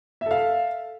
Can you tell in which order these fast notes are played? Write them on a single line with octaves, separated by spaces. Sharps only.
E5 A4 F5